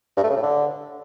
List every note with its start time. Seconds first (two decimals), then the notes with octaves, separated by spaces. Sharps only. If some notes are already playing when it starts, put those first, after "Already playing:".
0.17 G2
0.23 A3
0.30 C#3
0.36 A2
0.43 D3